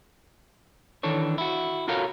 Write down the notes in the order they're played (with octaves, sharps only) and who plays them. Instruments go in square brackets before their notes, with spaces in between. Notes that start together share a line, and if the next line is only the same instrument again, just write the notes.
[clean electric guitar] D#3 E3 D4 A4 C#5
E4 F#4
F4 F#4 A4 A#4 C#5 F5